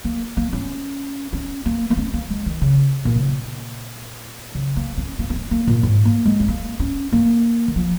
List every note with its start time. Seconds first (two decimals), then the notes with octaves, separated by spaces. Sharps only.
0.04 A#3
0.37 A#3
0.53 C#4
1.33 C#4
1.66 A#3
1.90 A#3
1.97 C#4
2.14 A#3
2.30 G#3
2.46 D#3
2.61 C#3
3.05 A#2
3.16 C#3
3.28 A#2
4.55 C#3
4.76 A#3
4.97 C#4
5.19 A#3
5.30 A#3
5.35 C#4
5.51 A#3
5.67 A#2
5.83 G#2
6.05 A#3
6.26 G#3
6.40 C#4
6.48 A#3
6.80 C#4
7.12 A#3
7.68 D#3
7.76 F3